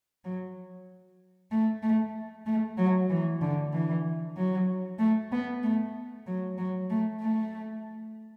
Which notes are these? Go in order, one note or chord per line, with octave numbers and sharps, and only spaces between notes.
F#3
A3
A3
A3
F#3
E3
D3
E3
F#3
A3
B3
A3
F#3
F#3
A3
A3